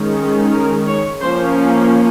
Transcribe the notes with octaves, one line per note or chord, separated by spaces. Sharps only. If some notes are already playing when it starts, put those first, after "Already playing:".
Already playing: D#3 G#3 C#4
A#4
C#5
F3 A#3 C#4 C5